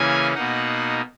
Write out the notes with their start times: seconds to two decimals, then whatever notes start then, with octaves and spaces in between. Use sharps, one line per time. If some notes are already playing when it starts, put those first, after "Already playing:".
Already playing: C#3 E3 A#3 C#4 G#5
0.34 B2 A#3 D#4 F#5